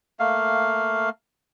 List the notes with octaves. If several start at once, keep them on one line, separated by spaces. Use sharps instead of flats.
A3 A#3 F5